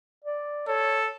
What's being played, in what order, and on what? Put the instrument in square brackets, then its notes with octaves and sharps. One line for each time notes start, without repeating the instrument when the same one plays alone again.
[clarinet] D5
[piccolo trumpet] A4 [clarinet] C#5